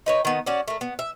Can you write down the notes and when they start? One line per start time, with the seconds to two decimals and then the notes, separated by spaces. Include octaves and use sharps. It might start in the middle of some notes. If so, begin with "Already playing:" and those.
0.06 D#4 B4 C#5
0.25 D#3 B3
0.46 C#4 F#4 D5
0.68 A3 A#3
0.81 B3
0.99 E5